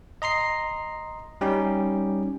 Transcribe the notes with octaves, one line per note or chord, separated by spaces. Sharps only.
D#5 A#5 C6 C7
G3 C#4 D#4 G4